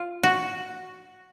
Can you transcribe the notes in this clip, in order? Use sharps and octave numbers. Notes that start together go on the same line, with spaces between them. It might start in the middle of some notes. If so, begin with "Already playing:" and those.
Already playing: F4
F#4